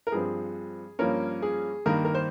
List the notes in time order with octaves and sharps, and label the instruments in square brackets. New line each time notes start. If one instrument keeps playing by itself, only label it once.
[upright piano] A#4
G2 F3 C4 G#4
G2 F3 A#3 C#4 A#4
G#4
G2 D#3 A#3 A#4
A#4
C5